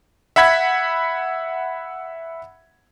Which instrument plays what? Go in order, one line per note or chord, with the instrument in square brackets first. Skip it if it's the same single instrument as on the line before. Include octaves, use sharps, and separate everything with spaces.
[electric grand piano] E5 F#5 B5 G#6 B6